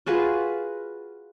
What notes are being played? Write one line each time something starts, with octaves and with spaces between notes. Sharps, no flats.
F4 F#4 G#4 B4